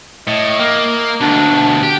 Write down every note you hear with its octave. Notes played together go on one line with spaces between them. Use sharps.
A2 D#5
A#3
D2 B2 D4
G4